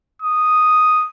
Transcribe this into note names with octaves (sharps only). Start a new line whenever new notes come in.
D#6